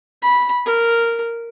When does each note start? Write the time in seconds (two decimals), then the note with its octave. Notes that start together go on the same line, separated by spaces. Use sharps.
0.22 B5
0.65 A#4